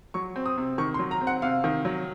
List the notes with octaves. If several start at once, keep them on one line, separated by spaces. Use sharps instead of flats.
F#3 C#6
C4
D#6
C3
D#3 C#6
C6
F#3
A#5
C4
F#5
C3 F5
D#3
F#3